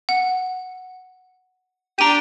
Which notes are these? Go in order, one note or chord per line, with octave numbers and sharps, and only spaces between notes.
F#5
D4 G4 A#5 D#7